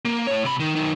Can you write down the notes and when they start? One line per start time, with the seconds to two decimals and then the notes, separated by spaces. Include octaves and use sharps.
0.05 A#3
0.27 A2 C#5
0.45 C3 B5
0.59 D#3
0.75 F#2 D#3